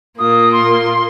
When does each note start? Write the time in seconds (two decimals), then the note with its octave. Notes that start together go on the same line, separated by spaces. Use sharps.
0.18 A#2 A#3 F4 D#6
0.52 C6